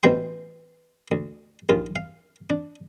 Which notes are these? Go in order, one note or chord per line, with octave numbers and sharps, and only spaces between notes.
A1 B2 E3 C5 G5 C6
D2
A#1 D#2 F4
F5
D4